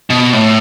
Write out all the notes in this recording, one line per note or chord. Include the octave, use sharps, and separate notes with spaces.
B2
A2